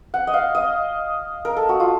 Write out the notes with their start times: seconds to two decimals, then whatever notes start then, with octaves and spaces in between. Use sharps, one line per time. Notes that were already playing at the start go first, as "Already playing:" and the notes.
0.14 F#5
0.27 D#5
0.34 F5
0.55 D#5
1.45 A#4
1.56 A4
1.69 F#4
1.80 F4